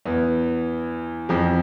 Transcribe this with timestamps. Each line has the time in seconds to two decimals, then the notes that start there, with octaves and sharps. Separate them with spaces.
0.06 E2 E3
1.29 F2 F3